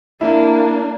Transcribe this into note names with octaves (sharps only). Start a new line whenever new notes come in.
A#3 D4 E4